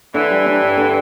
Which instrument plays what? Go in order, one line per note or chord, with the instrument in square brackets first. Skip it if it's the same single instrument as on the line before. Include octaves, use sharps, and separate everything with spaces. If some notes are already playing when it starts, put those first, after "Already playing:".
[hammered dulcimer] D3 [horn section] E3
[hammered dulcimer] G3
D4
G2
D3